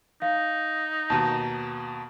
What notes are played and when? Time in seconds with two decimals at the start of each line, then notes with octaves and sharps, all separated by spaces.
0.22 D#4 F5
1.10 D#2 B2 A5 A#5